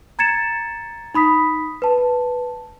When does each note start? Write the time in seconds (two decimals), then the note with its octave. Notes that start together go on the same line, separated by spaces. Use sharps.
0.19 A#5 G#6 A6 C#7 E7
1.14 D#4 B5 D#6 B6
1.82 B4 A5